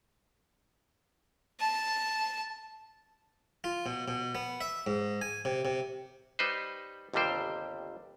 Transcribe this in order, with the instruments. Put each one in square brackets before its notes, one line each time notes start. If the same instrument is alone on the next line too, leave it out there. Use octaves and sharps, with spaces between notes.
[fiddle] A5
[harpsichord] F4
B2
B2
B3
E5
G#2
G#5
C3
C3
[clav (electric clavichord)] G3 D#4 B4 C5
G1 D#2 C3 G3 C5 G5